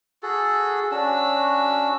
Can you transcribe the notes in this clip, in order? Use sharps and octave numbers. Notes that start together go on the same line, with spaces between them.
F#4 G#4 A4
C#4 D4 F#4 E6